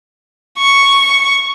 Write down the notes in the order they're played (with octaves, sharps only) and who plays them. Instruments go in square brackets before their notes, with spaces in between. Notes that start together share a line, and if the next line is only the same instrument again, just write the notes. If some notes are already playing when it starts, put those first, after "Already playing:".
[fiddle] C#6